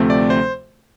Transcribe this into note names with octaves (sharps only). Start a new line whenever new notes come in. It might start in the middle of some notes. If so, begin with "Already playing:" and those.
Already playing: D2 C3 F3 A3 C4
D5
C5